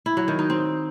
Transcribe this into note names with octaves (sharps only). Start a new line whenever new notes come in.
E4
F#3
D#3
D#4
C4